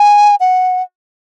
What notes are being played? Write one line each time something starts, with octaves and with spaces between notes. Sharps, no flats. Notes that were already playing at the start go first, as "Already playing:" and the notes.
Already playing: G#5
F#5